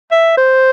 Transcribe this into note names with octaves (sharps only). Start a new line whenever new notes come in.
E5
C5